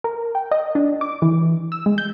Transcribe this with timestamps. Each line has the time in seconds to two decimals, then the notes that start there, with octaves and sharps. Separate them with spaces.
0.04 A#4
0.35 G5
0.51 D#5
0.75 D4
1.01 D6
1.22 E3
1.72 E6
1.86 G#3
1.98 G6